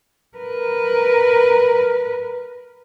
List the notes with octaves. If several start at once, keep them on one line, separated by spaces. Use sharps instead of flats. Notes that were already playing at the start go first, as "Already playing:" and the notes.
A#4 B4